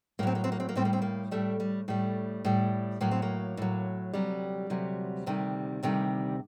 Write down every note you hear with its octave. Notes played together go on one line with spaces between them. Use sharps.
A2 F#3 A#3 C4
A#3
C4
A#3
C4
A#3
A2 G3 C4
A#3
C4
A#3
A2 G3 A3
G3
A2 G3 A3
A2 G3
A2 F#3 A#3
C4
A#3
A2 F#3
D2 C3 F#3 G3
D2 C3 F#3
D2 C3 D#3 G3
D2 C3 D#3 G3